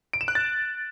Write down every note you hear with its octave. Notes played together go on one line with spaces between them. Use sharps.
D7
E7
F#6
A6